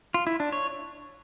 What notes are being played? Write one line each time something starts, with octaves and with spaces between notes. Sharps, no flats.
F4
E4
D4
C#5